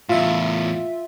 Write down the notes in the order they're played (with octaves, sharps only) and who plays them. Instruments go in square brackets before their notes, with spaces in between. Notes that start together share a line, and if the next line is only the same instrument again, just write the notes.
[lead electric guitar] E2 A2 [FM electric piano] F4 E5